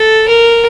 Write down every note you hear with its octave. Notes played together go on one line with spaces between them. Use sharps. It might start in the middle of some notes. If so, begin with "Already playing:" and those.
Already playing: A4
A#4